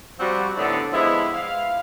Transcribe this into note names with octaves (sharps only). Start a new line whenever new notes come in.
F3 G3 C4 F#4
A2 D3 B3 D4 D#4 A4
F3 G#3 B3 E4
F5